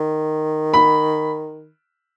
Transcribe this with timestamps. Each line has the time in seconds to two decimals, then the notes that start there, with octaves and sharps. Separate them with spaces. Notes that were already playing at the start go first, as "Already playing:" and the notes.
Already playing: D#3
0.74 B5